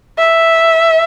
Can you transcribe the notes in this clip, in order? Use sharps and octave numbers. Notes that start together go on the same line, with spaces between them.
E5